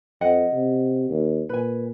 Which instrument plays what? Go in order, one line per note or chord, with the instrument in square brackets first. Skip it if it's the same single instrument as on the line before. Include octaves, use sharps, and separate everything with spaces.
[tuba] F2 [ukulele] D#5 F#5 G5
[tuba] C3
D#2
[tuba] A#2 [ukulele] B4 G#5